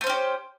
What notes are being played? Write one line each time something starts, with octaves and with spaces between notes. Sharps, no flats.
A3 C#4 G4 C5